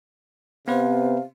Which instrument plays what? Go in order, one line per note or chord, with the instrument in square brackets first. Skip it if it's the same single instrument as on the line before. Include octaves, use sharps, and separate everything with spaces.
[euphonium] C3 [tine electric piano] B3 B4 C5 [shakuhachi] F5